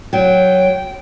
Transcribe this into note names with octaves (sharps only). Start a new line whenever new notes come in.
F#3 G5